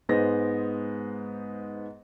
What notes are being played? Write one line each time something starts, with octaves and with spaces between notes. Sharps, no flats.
G#2 G#3 B3 C5 D#5 A#6